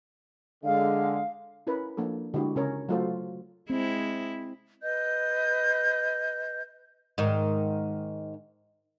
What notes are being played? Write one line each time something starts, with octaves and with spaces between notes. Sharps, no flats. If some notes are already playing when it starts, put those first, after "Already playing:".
D3 G#3 F5
C#4 E4 A#4 B4
F3 A#3 D4 A4
D3 G#3 E4 F#4 G4
C#3 C#4 A#4 C#5
F#3 A3 F4 F#4 A4 C5
G#3 C4 E4
B4 D#5 G6
G#2 D#3